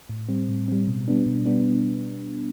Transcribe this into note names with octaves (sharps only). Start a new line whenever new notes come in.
A2
G3 C4
A2
G3 C4
B2
G3 B3 D4
B2
G3 B3 D4